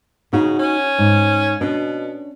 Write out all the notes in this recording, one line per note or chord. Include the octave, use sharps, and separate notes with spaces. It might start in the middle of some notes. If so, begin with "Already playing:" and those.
C#3 D#4 F#4
C#4
G#2
B2 C#4 D4